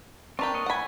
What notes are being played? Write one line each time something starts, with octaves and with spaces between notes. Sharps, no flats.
C4 D4 A#4 B4 G5 C#6
A#3 C#5 D#5
A2 F#5 G#5 B5